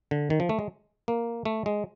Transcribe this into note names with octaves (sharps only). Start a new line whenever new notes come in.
D3
D#3
F3
A3
G#3
A#3
A3
G#3